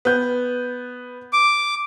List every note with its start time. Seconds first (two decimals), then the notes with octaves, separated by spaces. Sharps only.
0.05 B3 G6
1.33 D6